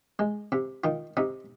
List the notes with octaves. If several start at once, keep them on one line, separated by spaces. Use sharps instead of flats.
G#3
C3
D#3 F4
C3 D#4